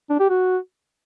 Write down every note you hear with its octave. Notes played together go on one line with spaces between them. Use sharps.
D4
G4
F#4